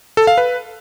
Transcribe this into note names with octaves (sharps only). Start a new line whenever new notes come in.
A4
F5
B4